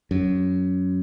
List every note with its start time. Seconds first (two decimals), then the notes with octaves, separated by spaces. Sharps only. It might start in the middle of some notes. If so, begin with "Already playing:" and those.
0.11 F#2